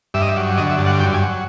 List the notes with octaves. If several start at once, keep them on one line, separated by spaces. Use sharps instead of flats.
G2 E5
D#5
E5
F#3
D3 D#5
E5
G2
F#5
F#2 G5
G#5
F#3